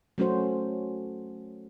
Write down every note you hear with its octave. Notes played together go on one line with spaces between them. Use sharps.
F#3 A3 C#4 F#4 C5